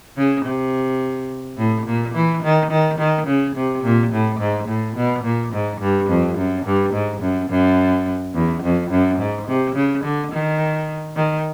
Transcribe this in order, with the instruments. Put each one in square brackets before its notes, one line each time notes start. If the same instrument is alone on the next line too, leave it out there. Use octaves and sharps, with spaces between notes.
[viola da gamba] C#3
C3
A2
A#2
E3
D#3
D#3
D#3
C#3
C3
A#2
A2
G#2
A2
B2
A#2
G#2
G2
F2
F#2
G2
G#2
F#2
F#2
E2
F2
F#2
G#2
C3
C#3
D3
D#3
D#3